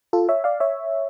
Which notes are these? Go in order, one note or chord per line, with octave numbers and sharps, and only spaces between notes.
F4 A4
C#5 E5
D5 F5
C#5 E5